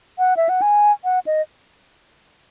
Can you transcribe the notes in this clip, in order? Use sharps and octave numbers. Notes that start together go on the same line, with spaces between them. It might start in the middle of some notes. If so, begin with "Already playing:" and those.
F#5
E5
F#5
G#5
F#5
D#5